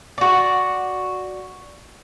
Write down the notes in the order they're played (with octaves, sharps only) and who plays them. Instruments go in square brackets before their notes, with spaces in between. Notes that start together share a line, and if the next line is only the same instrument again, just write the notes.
[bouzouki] F#4 D5